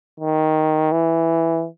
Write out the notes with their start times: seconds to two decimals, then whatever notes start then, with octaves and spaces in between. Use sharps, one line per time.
0.20 D#3
0.92 E3